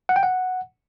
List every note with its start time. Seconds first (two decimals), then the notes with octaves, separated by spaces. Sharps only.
0.09 F#5
0.16 G5
0.23 F#5